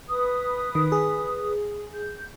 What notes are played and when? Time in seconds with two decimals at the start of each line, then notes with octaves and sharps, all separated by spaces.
0.08 B4 D#6
0.75 D#3
0.92 G#4
1.94 G6